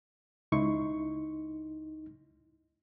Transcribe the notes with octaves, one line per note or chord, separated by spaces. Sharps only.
C#2 D#4 E4 C6 C#6